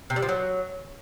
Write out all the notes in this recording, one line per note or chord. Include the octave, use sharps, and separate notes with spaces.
C3
G3
F3
F#3